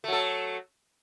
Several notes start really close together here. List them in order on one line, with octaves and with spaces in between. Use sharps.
A3 F#3 A4